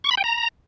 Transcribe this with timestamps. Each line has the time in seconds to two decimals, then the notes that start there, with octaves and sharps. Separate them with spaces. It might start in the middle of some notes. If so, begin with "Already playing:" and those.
0.04 C#6
0.11 B5
0.17 G5
0.24 A#5